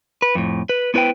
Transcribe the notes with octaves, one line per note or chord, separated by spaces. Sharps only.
B4
F2 A2
B4
B3 E4 B4 C5 G5